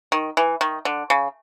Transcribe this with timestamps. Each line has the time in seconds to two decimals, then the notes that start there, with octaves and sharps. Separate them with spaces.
0.12 D#3
0.37 E3
0.61 D#3
0.85 D3
1.10 C#3